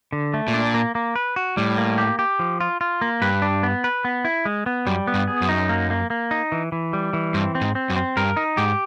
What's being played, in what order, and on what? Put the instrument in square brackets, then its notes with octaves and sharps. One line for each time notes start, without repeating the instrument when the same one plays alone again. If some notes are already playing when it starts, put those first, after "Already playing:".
[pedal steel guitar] D3
A3
[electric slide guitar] A#2
[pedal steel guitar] D4
A#3
A#3
B4
F#4
[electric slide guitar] A2 [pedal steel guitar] G3
[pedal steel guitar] A#3
G4
G4
F3
F4
F4
A#3
[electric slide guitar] G2 [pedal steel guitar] B4
[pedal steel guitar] D4
B3
B4
B3
E4
G#3
B3
[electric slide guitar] F#2 [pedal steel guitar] G3
[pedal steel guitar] B3
[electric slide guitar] G2
[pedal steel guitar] G#4
[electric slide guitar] F#2
[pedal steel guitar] D#4
A#3
A#3
A#3
D#4
E3
E3
G3
E3
[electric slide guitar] G2 [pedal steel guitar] C4
[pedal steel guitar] C4
[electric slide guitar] G#2
[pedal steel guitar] C4
[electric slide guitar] F#2
[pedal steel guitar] C4
[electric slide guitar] G2 [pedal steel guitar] A#4
[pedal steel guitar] D#4
[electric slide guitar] G#2 [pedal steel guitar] G4